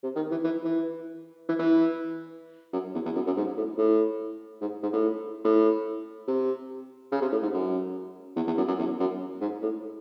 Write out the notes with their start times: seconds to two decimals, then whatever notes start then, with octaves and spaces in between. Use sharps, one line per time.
0.03 C3
0.16 D#3
0.31 E3
0.44 E3
0.65 E3
1.49 E3
1.59 E3
2.73 F#2
2.94 E2
3.05 E2
3.15 F#2
3.26 F#2
3.37 G#2
3.57 A2
3.78 A2
4.61 G#2
4.83 G#2
4.93 A2
5.44 A2
6.28 C3
7.12 C#3
7.21 C3
7.32 A2
7.42 G#2
7.54 F#2
8.36 E2
8.47 E2
8.57 F#2
8.68 F#2
8.78 E2
9.00 F#2
9.41 G#2
9.62 A2